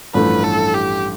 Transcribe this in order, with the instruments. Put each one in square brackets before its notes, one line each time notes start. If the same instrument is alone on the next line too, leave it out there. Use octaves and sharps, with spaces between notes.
[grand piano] A1 G2 F3 A3 E4 [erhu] B4
[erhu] A4
G4